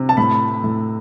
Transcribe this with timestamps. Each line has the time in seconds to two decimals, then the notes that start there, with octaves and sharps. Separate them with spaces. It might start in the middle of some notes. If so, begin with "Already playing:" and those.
Already playing: C3
0.09 A5
0.17 A2 B5
0.64 A2